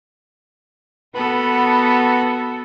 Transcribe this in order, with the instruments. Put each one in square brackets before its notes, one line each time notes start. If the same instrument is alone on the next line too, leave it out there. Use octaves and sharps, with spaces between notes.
[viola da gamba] B3 F#4 A4 [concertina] B4 B5